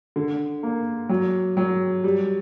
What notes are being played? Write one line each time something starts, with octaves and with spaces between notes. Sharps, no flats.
D3
A#3
F#3
F#3
G3